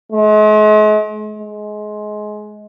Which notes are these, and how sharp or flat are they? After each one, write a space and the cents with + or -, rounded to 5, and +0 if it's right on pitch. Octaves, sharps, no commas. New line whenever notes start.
G#3 +45
G#3 +25